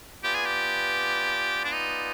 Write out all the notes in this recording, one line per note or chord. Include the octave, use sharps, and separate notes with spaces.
B3 F4 G4 B4 D5 G#5
G#4
G4
D4
D#4